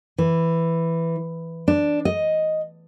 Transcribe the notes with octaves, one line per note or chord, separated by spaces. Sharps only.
E3
D4
D#5